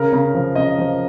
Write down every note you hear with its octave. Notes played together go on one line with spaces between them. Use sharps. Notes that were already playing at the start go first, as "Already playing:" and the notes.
Already playing: C#3 A#4
C#3
F3
C#3 D#5
F3